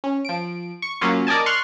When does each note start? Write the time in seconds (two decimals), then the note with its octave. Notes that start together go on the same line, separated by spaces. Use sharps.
0.04 C#4
0.25 F3 D7
0.82 C#6
1.01 F#3 A#3 C#4 F4
1.27 A#4 D5 D#5 G#5 A5
1.46 C6 C#6 F6 F#6